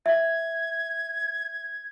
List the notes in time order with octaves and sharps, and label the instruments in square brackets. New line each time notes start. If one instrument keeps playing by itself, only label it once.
[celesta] E5 [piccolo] G#6